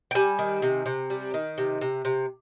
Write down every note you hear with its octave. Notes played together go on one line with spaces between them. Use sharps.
G5
G3 G#5
D#3
C3
C3
G3
D#3
C3
C3
C3